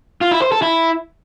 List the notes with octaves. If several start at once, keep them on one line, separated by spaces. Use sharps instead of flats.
F4
E4
C5
A4
E4